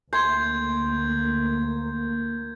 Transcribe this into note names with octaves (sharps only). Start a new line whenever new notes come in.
D2 A#3 C6 G6 G#6